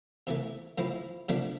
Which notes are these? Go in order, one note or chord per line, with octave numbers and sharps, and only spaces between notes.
C3 E3 A3
A2 F3 C4 E4
C3 F3 A3 D4